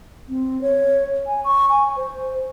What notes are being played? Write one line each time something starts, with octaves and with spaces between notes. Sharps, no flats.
C4
C#5
G#5
C#6
G#5
C5